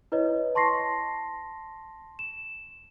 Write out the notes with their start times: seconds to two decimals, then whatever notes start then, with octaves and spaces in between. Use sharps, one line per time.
0.12 E4 B4 C#5 D#5
0.55 A5 C6 C#6 A#6 C7
2.19 E7